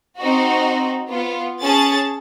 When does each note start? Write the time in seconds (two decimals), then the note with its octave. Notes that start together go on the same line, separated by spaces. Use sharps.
0.18 C4 D#4 F#4
1.09 B3 F4
1.62 C#4 G#4 A5 A6